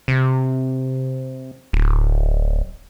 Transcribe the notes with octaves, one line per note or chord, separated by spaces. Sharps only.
C3
D1